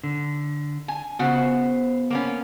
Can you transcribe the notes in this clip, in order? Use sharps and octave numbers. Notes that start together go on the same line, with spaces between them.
D3
G#5
C#3 B3 F#4 C5 F#5
A#3 B3 C#4